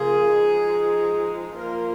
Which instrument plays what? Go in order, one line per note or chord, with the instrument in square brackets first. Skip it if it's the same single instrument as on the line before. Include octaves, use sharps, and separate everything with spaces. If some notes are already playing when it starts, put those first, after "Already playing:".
Already playing: [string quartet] C#3 F3 A#3 F4 [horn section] G#4
[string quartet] F3 G#3 D#4
[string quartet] F3 A#3 F4 [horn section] A#4